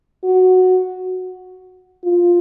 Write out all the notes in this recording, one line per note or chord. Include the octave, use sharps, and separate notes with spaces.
F#4
F4